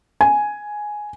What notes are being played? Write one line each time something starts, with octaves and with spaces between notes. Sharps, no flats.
G#5